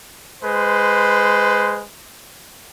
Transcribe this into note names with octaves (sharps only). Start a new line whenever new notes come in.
G#3 B4 C5